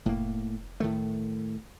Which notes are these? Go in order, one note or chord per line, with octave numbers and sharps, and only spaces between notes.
F1 A2 A#3
A2 D#3 A3